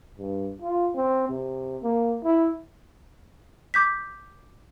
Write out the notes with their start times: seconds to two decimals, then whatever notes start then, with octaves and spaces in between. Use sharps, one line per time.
0.19 G2
0.62 F4
0.95 C4
1.29 C3
1.83 A#3
2.24 E4
3.74 D6 G6 B6